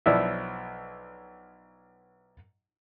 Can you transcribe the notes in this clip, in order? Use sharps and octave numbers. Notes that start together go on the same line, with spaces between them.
B1 F3 D4 E4 E5